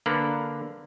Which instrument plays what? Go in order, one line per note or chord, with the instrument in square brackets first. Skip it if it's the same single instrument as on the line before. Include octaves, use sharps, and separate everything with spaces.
[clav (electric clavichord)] D3 A#3 D4 A#4 B4